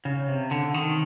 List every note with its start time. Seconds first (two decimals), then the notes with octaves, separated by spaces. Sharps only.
0.05 C#3
0.28 C3
0.51 D3
0.74 D#3